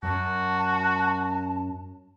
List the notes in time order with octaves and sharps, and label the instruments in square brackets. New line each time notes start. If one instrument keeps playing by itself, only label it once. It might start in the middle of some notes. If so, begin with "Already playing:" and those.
[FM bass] F#2 [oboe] F#4 [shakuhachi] A5